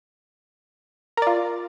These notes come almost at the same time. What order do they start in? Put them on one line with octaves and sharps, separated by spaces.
A#4 D5 F4